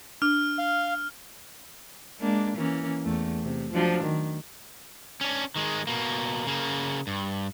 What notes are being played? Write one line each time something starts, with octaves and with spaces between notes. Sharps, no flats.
D4 F6
F5
G#3 A#3 D4
E3 A#3 C#4
E2 A3
C3
F3 F#3 D4
D#3
C#4 D4
D#3 G#3
B2 A#3
C#3 A#3
G2